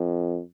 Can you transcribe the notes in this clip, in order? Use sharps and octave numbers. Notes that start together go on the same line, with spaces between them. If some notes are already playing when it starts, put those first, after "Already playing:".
Already playing: F2